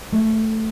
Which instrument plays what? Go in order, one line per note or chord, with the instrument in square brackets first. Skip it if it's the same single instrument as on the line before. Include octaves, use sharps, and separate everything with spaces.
[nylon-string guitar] A3